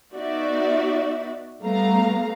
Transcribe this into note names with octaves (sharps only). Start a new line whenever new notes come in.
B3 D#4 F#4 D5 E5
G3 A3 B3 F5 A#5